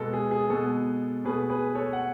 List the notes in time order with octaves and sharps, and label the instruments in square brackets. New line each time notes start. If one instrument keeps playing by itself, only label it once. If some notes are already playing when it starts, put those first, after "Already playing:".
Already playing: [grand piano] B2 G#3 B3 A4
G#4
G#4
B2 G#3 B3 A4
B2 G#4 B4
A3
G#4 B4
A4 C#5
F#5